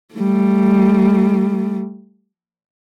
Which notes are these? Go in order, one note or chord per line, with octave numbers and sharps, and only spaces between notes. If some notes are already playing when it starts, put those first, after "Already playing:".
G3 A3